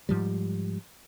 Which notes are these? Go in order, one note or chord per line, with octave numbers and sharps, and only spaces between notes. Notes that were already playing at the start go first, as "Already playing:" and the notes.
G#2 F3 G3